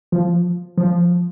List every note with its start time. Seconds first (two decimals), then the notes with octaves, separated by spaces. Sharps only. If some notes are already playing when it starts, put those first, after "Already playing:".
0.12 F3
0.77 F3